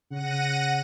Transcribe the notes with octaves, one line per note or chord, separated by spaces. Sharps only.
C#3 F#5 A#6 D#7